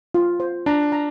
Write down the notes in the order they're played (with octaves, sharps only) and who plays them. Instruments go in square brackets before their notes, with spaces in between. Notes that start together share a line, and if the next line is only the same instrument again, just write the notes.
[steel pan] F4
C5
[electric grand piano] D4 [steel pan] A#5
[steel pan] A#5